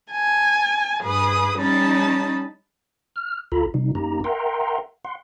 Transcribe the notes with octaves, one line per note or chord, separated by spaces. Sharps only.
G#5 A5
G2 G#4 B4 D#6
G3 C#4 D#4 A5 B5
F6
D2 F4 A4 A#5 B5
C3 G3 D#4
F#2 A#3 D#4 G4 A#5
A#4 E5 F#5 G5 A#5 C6
F#5 C6